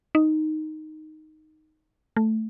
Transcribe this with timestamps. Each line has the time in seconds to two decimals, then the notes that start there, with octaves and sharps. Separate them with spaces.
0.15 D#4
2.16 A3